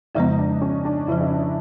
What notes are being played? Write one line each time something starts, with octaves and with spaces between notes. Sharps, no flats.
F2 C#3 F3 G#3 B3 D#4
D4
C#4
D4
F2 C#3 F3 E4
D#4
D4